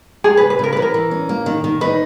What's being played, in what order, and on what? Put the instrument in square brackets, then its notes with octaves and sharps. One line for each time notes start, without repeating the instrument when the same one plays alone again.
[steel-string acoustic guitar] G#3 [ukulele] G#4
[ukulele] B4
[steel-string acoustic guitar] C#3
[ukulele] B4
[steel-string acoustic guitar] C#3 [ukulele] A#4
[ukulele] B4
[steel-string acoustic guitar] E3
[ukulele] A#4
[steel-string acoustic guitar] E3
C#4
A#3
D#3
D#3
[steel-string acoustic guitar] D#4 [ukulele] B4